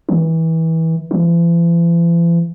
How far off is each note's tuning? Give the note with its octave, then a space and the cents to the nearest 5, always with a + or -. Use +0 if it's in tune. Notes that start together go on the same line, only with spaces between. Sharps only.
E3 -25
E3 +45